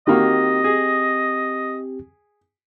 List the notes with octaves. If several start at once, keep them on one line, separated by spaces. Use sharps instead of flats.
D#3 A#3 C4 F#4 G4 D#5
G#4